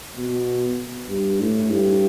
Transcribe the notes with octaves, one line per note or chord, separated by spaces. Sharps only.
B2
G2
A2
G2